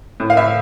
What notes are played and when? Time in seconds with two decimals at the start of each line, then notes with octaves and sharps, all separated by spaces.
0.20 A2
0.30 F5
0.37 A2 E5